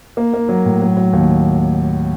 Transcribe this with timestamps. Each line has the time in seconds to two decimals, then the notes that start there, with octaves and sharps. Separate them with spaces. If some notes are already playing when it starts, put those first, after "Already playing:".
0.17 A#3
0.34 A#3
0.49 F#3
0.66 A2
0.82 F#3
0.97 F#3
1.13 D#2